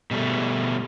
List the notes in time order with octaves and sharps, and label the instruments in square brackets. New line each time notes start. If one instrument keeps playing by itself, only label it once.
[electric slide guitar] B2 G3 A3